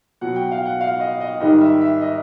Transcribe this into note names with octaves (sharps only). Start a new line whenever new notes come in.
B2 F#3 F#5
G5
F5
F#5
F5
D#5
D#5
G#2 D#3 G3 D#5
E5
E5
D#5